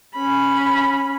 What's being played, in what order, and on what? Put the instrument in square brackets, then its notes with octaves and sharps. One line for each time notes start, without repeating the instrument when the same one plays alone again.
[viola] C#4 B5